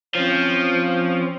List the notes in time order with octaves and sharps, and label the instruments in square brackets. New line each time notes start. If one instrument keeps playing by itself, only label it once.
[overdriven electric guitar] F3 [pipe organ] C4 C#4